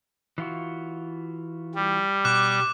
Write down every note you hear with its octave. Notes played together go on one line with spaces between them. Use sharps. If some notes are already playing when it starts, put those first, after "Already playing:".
E3 F4 F#4
G3
B2 D6 F#6